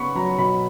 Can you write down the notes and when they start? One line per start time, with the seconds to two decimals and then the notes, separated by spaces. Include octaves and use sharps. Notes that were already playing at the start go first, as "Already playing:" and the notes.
Already playing: C#3 B3 B5 C#6
0.15 F#3 A#5
0.38 B2 B5